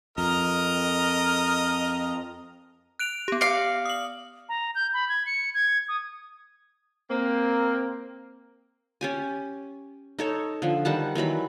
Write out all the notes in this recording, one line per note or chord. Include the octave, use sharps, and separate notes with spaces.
F2 A#4 D#5 A#5
F#6 D7 F7
B3 G4
D5 F5 C7 C#7
D#6 F#7
A#5
G6
B5
G#6
C#7
G#6
D#6
A#3 C4
C#4 G4 G#5
D#4 A4 C#5
D3 F3
D#3 G3 F#5 A5
D#3 E3 F#3 B5